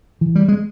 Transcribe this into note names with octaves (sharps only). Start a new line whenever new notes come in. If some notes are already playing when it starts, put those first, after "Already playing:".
E3
G3
G#3